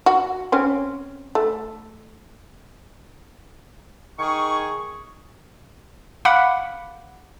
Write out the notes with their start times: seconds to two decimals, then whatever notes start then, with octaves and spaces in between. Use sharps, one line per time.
0.06 F#4
0.52 C4 C#4
1.35 A3
4.19 D#3 G#4 G#5 C#6
6.25 F5 F#5 B5 D6